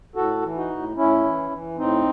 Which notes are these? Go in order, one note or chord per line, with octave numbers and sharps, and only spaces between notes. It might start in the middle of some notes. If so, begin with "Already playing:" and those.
A2 F#4 A4
E3
D#4 F#4
A2
A2 C#4 E4
E3
E3
A2 C4 D#4